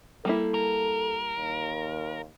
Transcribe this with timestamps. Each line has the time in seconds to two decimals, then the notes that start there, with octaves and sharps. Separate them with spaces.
0.25 G3 A#3 E4 A4
0.54 A#4
1.37 D#2